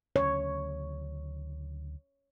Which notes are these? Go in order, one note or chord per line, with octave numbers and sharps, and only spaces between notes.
D2 C#3 F#3 C#5